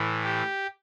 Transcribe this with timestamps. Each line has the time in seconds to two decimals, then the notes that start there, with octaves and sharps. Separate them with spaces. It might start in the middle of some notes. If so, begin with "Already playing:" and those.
Already playing: A2 E3
0.24 G4